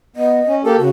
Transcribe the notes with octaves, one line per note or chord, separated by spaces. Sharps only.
B3 D#5
C#4
A#3 G4 A4 A#4
C#3 F#4